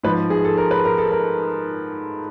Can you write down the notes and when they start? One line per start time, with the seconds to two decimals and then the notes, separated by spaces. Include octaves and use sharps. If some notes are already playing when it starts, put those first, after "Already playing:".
0.03 G#2 F3 B4
0.30 G#4
0.45 A4
0.58 A#4
0.71 B4
0.85 A#4
0.98 A4
1.12 A#4